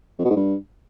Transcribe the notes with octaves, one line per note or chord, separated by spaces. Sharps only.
F2
B2
G#2
G2